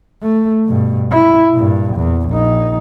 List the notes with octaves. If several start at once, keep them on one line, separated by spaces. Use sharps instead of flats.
A3
G2 B2
E4
G2 A#2
E2
A#1 D#4